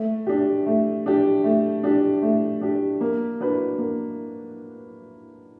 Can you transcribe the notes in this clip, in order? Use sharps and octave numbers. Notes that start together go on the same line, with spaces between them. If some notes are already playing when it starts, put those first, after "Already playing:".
Already playing: A3
D4 G4
A3
D4 G4
A3
D4 G4
A3
D4 G4
A#3
D4 F#4 B4
A#3